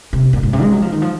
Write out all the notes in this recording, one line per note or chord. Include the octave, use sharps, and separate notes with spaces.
C3
A#2
G#2
C3
G#3
F#3
F3
D#3
F3